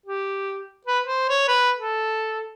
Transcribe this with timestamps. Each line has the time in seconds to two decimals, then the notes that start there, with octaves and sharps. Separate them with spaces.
0.06 G4
0.87 B4
1.04 C5
1.29 C#5
1.48 B4
1.76 A4